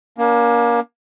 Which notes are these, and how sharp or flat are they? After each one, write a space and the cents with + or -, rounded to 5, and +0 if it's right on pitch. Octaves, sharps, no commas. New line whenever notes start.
A#3 +25 D4 -45